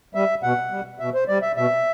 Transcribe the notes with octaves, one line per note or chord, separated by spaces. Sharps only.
G3 E5
B2 F#5
G3
B2 E5
C5
G3 D5
E5
B2 E5